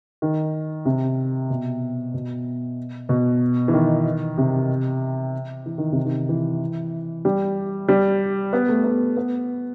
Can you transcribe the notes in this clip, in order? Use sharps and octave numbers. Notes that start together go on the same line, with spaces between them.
D#3
C3
B2
B2
B2
E3
D#3
C3
E3
D#3
C3
D#3
E3
G3
G3
B3
A3
B3
B3